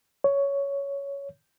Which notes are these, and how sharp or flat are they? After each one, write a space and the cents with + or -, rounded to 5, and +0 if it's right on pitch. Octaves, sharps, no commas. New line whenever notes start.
C#5 +10